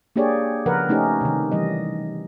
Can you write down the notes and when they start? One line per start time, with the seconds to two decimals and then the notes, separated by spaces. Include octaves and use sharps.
0.16 A#3 D4 G4 G#4 C#5 D5
0.66 C#3 F3 A#4 B4 F#5
0.89 A3 C#4 D#4 G4
1.21 C3 D#3
1.52 E3 G3 D#5